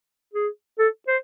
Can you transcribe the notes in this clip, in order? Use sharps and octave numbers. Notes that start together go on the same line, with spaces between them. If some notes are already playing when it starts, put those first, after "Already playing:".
G#4
A4
C5